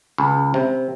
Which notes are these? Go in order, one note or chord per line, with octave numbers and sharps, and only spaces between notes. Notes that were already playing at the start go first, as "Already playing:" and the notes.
C#2
C3